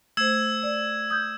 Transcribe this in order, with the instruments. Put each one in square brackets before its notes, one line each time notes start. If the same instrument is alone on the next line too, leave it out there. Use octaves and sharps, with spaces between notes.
[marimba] A3 C5 [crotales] E6 G#6 E7
[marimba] D5
D#6 G6